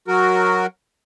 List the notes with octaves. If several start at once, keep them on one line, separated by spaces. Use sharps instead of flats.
F#3 F#4 A#4